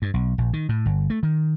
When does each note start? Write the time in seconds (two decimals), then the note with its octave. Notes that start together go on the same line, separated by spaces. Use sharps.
0.02 G2
0.14 B1
0.38 A#1
0.53 D#3
0.69 A2
0.86 G1
1.10 A3
1.23 D#3